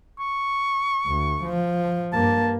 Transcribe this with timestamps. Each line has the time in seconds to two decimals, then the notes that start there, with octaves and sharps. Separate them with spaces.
0.19 C#6
1.07 D2
1.44 F3
2.13 G2 A#3 A5